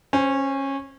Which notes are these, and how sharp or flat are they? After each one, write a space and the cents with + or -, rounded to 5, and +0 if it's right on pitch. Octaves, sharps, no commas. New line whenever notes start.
C#4 -20 C5 +0